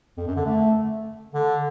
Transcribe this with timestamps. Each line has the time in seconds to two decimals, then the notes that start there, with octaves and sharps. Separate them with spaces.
0.17 F2
0.27 F#2
0.36 D3
0.46 A3
1.34 D3